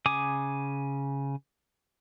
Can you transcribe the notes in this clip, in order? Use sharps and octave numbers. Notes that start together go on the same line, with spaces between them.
C#3 G#5 D6 D#6